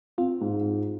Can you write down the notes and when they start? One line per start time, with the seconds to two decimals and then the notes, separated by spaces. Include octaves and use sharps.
0.18 C4 F4
0.41 G#2